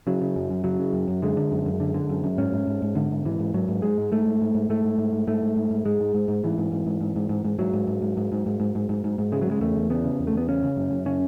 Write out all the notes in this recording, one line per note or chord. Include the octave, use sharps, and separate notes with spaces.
C#3 F#3
C#3
F#2
F#2
C#3 F#3
C#3
F#2
F#2
D3 G#3
D3
F#2
F#2
D3
D3
F#2
F#2
G#2 C#4
G#2
G#2
G#2
G#2 D3
G#2
G#2 E3
G#2
G#2 F#3
G#2
G#2 G#3
G#2
G#2 A3
G#2
G#2
G#2
G#2 A3
G#2
G#2
G#2
G#2 A3
G#2
G#2
G#2
G#2 G#3
G#2
G#2
G#2
G#2 E3
G#2
G#2
G#2
G#2
G#2
G#2
G#2
G#2 F#3
G#2
G#2
G#2
G#2
G#2
G#2
G#2
G#2
G#2
G#2
G#2
C#3 G#3
F#3
C#3 G#3
E2 A3
E2
C#3 B3
C#3
E2
A3
E2 B3
C#3 C#4
C#3
F#2
F#2
C#3 C#4